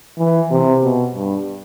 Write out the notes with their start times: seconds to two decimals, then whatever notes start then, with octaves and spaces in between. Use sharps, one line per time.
0.18 E3
0.51 C3
0.84 B2
1.15 G2